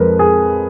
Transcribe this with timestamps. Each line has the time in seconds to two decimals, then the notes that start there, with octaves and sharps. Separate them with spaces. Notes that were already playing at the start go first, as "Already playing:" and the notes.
Already playing: F2 F3 G#3 A#4 B4
0.19 G#4